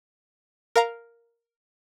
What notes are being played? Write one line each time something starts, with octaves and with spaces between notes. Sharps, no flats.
A#4 F5 A#5